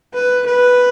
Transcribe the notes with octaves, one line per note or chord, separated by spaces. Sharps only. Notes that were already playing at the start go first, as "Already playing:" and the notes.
B4
B4